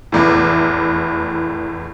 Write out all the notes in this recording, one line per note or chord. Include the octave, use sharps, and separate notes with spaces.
F1 E2 A2